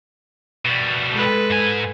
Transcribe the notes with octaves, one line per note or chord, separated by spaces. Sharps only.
B2 G3
G#3 A4 B4
G#2 G#5